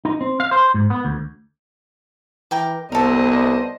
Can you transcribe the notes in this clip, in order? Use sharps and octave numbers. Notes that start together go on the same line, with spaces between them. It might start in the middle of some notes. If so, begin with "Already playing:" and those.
D#4
C4
F5
C5
G#2
B3
D2
E3 A#4 G5 D6
C2 B3 A4 A#4 C5 D5 D#5